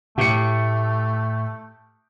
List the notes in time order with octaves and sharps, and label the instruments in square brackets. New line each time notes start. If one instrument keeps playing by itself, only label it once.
[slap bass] A2 [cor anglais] A3 [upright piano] G4 C#7